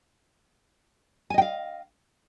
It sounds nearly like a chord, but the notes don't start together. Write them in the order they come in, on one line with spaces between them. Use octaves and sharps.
G#5 D#5 G5 F5